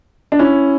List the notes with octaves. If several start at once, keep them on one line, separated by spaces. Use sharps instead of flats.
D4
C#4 E4